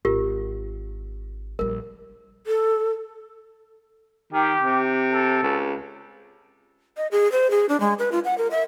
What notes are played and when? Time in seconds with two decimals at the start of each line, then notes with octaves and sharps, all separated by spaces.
0.05 G#1 F4 G4 A#4
1.59 A#1 G3 A#4
2.47 A4
4.33 D#3 G4
4.63 C3
5.12 A4
5.43 C#2
6.97 D#5
7.12 G#4
7.32 C5
7.51 G#4
7.69 D4
7.80 G#3
7.99 B4
8.12 F4
8.25 F#5
8.38 A#4
8.51 E5